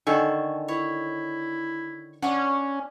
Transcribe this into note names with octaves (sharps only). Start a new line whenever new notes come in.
D3 D#3 A4 G#5 C#6
E4 C#5
C#4 D4 F#5 C#6